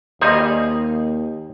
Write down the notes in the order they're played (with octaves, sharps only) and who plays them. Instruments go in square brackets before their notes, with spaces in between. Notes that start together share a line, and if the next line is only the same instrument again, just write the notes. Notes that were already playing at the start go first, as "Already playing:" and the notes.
[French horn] D#2 [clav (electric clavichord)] G3 D#4 C5 [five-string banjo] G#4 D#5 F5